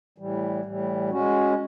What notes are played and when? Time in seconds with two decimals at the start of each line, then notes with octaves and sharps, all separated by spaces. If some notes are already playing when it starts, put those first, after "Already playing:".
0.18 A2 E3 G3
0.65 A2 E3 G3
1.10 G#3 C#4 F#4